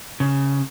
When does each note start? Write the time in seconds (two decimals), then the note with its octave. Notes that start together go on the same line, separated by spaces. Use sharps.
0.20 C#3